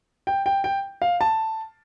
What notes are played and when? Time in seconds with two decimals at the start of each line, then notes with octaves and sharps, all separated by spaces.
0.27 G5
0.46 G5
0.64 G5
1.02 F5
1.21 A5